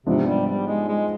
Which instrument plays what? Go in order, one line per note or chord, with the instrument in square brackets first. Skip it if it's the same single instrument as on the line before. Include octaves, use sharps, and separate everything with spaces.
[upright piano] G#2 F3 B3 D4 [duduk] C3
[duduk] G3
G3
G#3
G#3